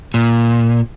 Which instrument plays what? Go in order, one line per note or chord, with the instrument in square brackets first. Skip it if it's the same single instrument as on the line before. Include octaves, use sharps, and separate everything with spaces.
[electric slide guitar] A#2